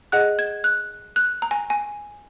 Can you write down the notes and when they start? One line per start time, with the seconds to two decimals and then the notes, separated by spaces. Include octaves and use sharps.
0.12 G#4 D#5 F#5 F#6
0.39 G#6
0.64 F#6
1.16 F#6
1.42 A#5
1.51 G#5
1.70 G#5